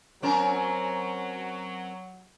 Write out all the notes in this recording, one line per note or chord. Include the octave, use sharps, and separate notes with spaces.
F#3 C4 C#4 A#4